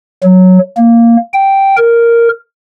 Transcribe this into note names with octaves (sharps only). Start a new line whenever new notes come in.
F#3
A#3
G5
A#4